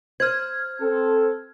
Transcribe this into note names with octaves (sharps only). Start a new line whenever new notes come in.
C5 F6 G#6
C4 A4